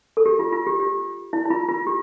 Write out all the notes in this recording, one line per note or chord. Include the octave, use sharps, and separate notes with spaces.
A4
G4
F4
F4
G4
G4
E4
E4
F4
F4
G4